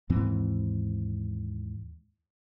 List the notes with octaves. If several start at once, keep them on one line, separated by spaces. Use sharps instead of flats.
D#2 G#2 E3 C4